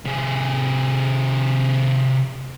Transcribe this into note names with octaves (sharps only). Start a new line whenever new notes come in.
C3 G#4